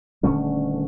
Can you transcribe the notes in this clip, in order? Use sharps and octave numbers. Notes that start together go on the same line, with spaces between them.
D#1 D3 A3 C#4